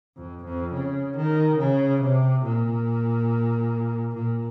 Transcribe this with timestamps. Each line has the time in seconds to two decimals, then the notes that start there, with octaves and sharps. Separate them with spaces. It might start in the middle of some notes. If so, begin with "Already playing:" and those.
0.17 F2
0.45 F2
0.73 C#3
1.17 D#3
1.59 C#3
2.02 C3
2.44 A#2
4.15 A#2